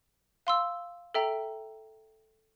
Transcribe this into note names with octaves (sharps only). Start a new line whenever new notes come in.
F5 C6 E6
A4 E5 G5 A#5